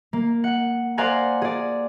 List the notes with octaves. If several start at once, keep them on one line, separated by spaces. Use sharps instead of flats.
A#3
F#5
C5 D5 F5 F#5 G#5 A#5
G#4 D5